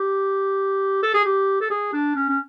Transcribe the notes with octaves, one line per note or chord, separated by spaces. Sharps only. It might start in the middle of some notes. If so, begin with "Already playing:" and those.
Already playing: G4
A4
G#4
G4
A4
G#4
D4
C#4
C#4